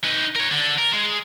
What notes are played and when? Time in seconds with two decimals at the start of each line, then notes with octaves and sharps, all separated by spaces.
0.04 D#4 B4
0.36 A#4 C#5
0.51 D3
0.78 A#4
0.93 G#3